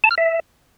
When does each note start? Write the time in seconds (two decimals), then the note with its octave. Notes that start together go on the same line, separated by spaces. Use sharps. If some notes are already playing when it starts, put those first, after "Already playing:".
0.04 A5
0.11 F6
0.18 E5